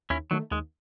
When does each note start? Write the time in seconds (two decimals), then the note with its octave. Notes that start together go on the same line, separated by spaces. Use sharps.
0.10 D#2 C#4 E4
0.31 D#3 F#3 A3
0.51 D#2 G#3